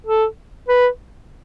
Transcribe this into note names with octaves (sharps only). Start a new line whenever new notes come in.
A4
B4